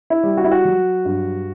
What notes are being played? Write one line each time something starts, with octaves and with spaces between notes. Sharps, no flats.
E4
G3
F#4
E4
F#4
F#3
G2